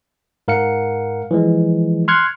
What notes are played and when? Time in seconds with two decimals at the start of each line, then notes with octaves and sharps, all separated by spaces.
0.48 G#2 A#4 F5 F#5 C#7
1.31 E3 F3 G#3
2.08 C6 F6 F#6 G#6 C#7